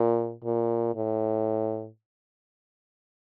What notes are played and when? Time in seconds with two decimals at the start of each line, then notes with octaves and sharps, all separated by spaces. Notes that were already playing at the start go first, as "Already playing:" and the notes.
Already playing: A#2
0.44 A#2
0.95 A2